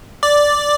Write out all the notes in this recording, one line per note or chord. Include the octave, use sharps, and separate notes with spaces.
D5